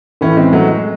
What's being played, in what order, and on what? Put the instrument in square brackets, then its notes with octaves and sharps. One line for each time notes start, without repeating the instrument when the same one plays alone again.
[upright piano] A2 E3 A3 C#4
G#3 C4
F#3 A3
G#3